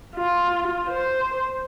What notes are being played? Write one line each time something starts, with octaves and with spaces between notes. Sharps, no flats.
F4
C5